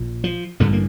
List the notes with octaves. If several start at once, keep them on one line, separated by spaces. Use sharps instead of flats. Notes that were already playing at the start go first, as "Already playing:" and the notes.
Already playing: A#1 A#2
F3
A1 G2 D3 A3
A#3